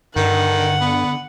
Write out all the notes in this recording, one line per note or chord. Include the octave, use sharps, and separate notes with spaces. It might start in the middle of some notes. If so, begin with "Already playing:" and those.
G2 D3 D#3 F#5
B3